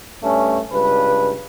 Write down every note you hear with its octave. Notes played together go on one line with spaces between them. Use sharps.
G2 A3 C#4
C#2 G2 B4